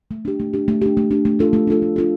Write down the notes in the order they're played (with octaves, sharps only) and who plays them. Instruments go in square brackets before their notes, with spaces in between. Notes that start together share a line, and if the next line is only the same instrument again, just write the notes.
[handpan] A3
D4 G4
A3
D4 G4
A3
D4 G4
A3
D4 G4
A3
D4 F4 A4
A3
D4 F4 A4
A3
D4 F4 A4